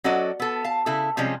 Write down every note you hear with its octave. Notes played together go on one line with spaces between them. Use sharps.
F#3 C#4 F#4 A4 D5 D#5
B3 A4
F5 A5
C#3 E4 A4
C3 F3 G3 G#3 C#4